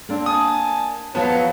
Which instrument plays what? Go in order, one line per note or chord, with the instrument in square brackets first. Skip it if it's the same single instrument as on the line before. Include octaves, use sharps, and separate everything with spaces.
[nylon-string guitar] A#3 D4 [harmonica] C4
[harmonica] G#5 A5 [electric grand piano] D#6
[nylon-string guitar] E2 F3 A5 [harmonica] F#3 C#5 [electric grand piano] B3